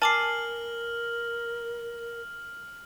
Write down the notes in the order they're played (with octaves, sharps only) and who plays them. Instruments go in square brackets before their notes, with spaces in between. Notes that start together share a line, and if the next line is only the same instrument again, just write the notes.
[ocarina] A#4 [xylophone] G#5 D6 C7 [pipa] A5 [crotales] F6 F#7